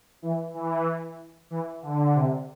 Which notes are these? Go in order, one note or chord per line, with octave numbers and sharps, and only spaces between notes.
E3
E3
E3
D3
C3